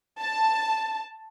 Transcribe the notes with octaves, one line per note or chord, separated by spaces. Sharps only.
A5